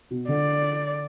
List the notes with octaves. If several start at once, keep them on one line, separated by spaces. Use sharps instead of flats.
B2
D3 D5